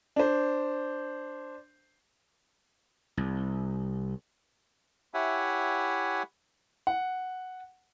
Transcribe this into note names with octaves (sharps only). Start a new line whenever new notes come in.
D4 C5
C2
E4 G4 C#5 E5 F#5 G#5
F#5